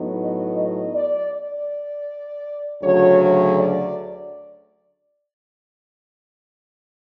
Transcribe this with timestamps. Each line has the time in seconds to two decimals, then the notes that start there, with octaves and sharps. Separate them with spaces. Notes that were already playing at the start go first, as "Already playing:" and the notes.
Already playing: A2 F#3 B3 D#4
0.20 D#5
0.57 D#5
0.94 D5
1.32 D5
2.82 D2 C#3 F#3 C#5
3.19 C#5
3.56 D5